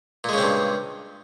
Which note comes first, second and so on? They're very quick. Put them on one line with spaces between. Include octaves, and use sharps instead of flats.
A#2 G#3 C#3 C4 G2